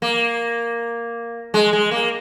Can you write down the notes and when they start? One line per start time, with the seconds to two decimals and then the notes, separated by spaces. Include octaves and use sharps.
0.02 A#3
1.54 G#3
1.73 G#3
1.91 A#3